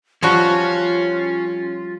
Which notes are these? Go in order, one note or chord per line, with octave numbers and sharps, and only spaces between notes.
F3 G3 C#4 F4 F#4